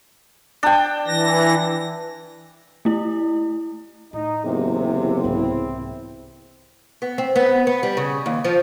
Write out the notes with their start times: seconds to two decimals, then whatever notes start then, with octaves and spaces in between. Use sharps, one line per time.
0.63 D4 G5
1.07 E3 A#6
2.85 A3 E4
4.13 A2 D#4
4.44 F#1 E2 C3
5.24 C2 G#2 C4 E4
7.02 B3
7.18 C4
7.36 B3
7.67 B3
7.83 G3
7.97 C#3
8.26 D#2
8.45 F3